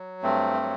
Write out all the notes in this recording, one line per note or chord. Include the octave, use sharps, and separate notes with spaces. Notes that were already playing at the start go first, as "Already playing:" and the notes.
Already playing: F#3
G2 A3 C4
F#3